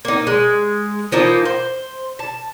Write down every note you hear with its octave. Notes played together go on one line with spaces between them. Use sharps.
A#3 D#4
G#3
E3 F3 A#3 D#4
C5
A5